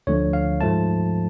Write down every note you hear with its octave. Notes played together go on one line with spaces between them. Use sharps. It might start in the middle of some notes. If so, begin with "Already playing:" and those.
D2 D3 F3 A3 C#5
F5
G#2 F3 A3 A5